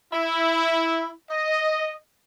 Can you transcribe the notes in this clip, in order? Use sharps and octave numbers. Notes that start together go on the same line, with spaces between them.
E4
D#5